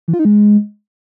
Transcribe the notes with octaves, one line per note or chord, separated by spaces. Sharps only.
E3
F4
D#4
G#3